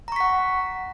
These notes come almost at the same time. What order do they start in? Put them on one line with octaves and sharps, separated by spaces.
A#5 C#6 B6 F#5